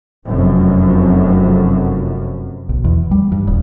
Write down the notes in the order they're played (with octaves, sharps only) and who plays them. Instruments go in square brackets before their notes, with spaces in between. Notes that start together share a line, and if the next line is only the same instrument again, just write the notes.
[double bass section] F1 F#2
[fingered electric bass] B1
E2
G3
G2
D#1